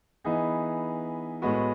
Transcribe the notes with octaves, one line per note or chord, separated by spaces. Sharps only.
E3 B3 D#4 G#4
A2 G#3 B3 F#4